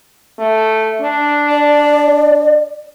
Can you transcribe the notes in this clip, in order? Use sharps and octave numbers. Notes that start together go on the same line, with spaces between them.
A3
D4
D5